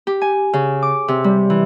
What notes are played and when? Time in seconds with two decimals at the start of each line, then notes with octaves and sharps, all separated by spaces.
0.07 G4
0.21 G#5
0.53 C#3
0.82 D6
1.08 C3
1.24 G3
1.50 E3